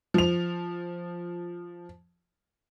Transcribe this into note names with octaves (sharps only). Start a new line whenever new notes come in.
F3 F7